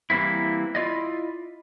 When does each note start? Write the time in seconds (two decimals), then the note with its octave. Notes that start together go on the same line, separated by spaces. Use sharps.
0.10 E3 G3 A#3 C4 E4
0.75 E4 F4 D5 D#5